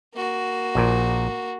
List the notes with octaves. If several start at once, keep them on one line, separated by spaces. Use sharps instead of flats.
A#3 F#4
A#1 A#2